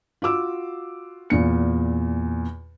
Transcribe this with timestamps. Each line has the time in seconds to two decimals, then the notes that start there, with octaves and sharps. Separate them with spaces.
0.22 F4 F#4 D6 E6
1.30 E2 A#2 C#7